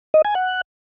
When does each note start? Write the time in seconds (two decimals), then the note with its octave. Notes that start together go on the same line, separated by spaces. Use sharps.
0.14 D#5
0.25 G#5
0.35 F#5